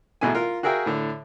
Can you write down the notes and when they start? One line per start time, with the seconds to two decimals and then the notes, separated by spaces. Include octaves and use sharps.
0.21 A1 B2 A3 G#4 G#5
0.35 F4 A#4
0.63 F#4 G#4 A#4 E5 F5 G5
0.86 A2 D3